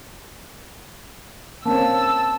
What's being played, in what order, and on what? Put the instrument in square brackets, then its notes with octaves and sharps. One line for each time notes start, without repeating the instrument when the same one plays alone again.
[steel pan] A#3 C4 C#4 [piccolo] A5 [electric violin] E6